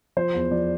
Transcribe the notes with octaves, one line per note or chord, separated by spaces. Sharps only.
F3 C5
E2
F3 D5